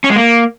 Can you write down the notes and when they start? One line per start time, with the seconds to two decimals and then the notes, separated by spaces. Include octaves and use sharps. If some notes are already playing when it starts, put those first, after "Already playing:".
0.04 C#4
0.10 G#3
0.16 A#3